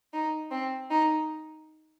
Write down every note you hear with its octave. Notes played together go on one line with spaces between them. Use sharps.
D#4
C4
D#4